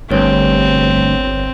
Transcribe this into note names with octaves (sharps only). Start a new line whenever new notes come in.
G1 D2 G2 C4 B4 C#5